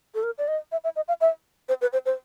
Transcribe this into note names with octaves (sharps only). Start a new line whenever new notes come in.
A4
A#4
D5
D#5
E5
E5
D#5
F5
E5
C5
B4
C5
C5